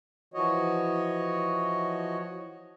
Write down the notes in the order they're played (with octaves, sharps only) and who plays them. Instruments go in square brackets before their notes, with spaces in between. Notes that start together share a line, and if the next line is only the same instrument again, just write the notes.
[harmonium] E3 F3 F#4 C#5 D#5